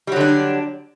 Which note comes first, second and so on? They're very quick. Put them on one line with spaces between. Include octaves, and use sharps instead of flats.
G3 F#3 D3 D4